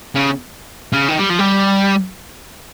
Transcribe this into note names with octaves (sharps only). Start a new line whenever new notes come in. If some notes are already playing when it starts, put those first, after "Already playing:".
C#3
C#3
D#3
G3
F3
G3